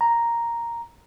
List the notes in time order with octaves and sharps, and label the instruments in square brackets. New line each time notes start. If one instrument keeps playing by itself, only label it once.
[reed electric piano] A#5